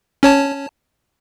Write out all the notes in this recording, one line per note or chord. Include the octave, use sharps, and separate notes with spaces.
C#4 C#5 A5